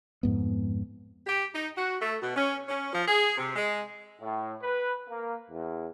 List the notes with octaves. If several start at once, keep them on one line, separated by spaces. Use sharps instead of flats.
F2 G#2 B3
G4
D#4
F#4
A3
B2
C#4
C#4
F3
G#4
C3
G#3
A2
B4
A#3
E2